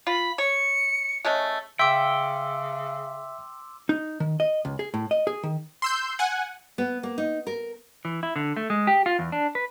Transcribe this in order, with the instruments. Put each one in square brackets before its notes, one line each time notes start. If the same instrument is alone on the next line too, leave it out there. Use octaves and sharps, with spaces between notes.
[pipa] F4 [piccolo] B5
[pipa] C#5 [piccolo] C#7
[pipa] G#3 A3 C#4
[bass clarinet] C#3 [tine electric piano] E5 [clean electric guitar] G5 [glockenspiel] C6 D6 E6
[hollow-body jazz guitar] D#4
D#3
D#5
C#2
G#4
A2
D#5
G#4
D#3
[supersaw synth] C6 E6 G6
F#5 G#5
[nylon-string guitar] B3
A#3
D#4
A#4
[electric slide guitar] E3
E4
D3
A3
G#3
G4
F4
E2
D4
B4